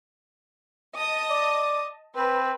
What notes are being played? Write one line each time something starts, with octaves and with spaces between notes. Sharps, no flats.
D#5 A5 D#6
D5
C4 B4